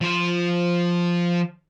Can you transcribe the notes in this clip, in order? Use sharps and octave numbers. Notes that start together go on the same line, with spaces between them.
F3 C5